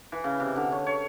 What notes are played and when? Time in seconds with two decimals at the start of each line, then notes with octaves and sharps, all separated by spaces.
0.12 E3
0.24 C#3
0.40 C3
0.56 D3
0.72 C#5
0.87 C#5